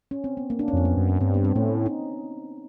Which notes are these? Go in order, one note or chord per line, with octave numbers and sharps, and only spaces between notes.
C#4
C4
B3
A#3
D4
C#4
F2 C4
B3
F#2
G2 C4
B3
C4
A2 C#4
D#4